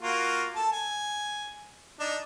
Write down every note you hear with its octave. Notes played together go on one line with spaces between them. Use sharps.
A#3 F4 F#4
A4 A5
G#5
D4 D#4